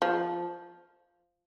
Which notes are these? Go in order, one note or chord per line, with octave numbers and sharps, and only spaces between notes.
F3